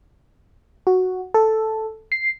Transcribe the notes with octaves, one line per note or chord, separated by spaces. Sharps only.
F#4
A4
C7